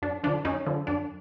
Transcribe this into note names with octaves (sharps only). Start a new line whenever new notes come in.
F#2 D4
D3 F3 D4
F#2 C#4 D#4
D3 F3
F#2 D4